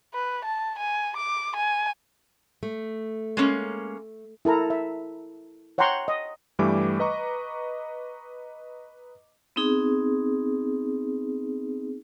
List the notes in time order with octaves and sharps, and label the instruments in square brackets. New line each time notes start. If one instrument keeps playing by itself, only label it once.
[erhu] B4
A5
G#5
D6
G#5
[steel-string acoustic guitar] A3
[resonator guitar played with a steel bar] G#3 A#3 C#4
[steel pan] E4 A4 A#4 A#5
E5
C#5 F#5 G5 A#5 C6 C#6
D#5
[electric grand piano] G2 E3 G3 A3 D6
B4 D#5 A#5 C#6
[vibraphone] B3 C4 D#4 G#4